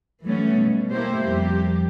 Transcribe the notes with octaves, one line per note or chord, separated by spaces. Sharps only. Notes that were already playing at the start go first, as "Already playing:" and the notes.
E3 F#3 G3 A3 B3 C#4
B2
A3 A#3 E4 G4 C5
F2 G3 A#3 G4